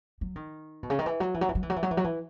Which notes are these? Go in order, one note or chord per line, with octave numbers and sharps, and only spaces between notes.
F#3
D#3
B2
C#3
D#3
E3
F#3
E3
F#3
E3
F#3
E3
F#3
E3
F#3
E3
F#3
E3